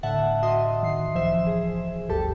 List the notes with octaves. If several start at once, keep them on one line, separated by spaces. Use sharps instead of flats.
A2 D3 E5 F#5 A5
F#4 D#5 E5 C6 D#6
D#3 C7
C#2 E3 F3 C5 E5 E7
G#4
G1 D2 G2 G4 A4 A5